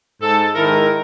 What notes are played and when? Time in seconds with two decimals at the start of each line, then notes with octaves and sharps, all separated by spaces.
0.22 G#2 A4
0.55 G#2 D#3 E4 A#4